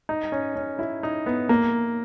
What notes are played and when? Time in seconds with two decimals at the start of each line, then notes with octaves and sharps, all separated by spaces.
0.09 D#4
0.32 C#4
0.56 C#4
0.79 E4
1.03 D#4
1.26 B3
1.49 A#3